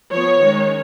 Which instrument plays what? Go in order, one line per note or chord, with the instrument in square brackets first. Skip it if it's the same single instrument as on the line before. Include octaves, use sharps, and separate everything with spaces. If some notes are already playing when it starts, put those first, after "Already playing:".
[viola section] F3 B3 C#5
D#3 G#3 C#4